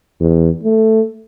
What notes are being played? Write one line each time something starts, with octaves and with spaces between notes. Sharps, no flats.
E2
A3